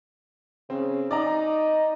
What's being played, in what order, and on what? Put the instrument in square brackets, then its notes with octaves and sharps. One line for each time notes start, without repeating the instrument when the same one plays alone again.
[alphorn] C#3 [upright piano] C4
[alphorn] D#4 [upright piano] D5 D#5 A#5